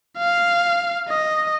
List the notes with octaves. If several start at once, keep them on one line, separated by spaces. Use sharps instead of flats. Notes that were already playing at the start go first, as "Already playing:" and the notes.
F5
D#5